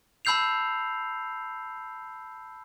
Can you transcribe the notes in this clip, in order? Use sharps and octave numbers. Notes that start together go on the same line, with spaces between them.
A5 B5 E6 G6 C7 F7